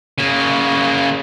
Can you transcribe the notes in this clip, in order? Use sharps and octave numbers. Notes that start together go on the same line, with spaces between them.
C#3 A#3